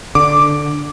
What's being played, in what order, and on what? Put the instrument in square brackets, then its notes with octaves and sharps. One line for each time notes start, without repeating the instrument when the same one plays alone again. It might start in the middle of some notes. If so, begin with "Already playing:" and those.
[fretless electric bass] D3 [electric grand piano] D6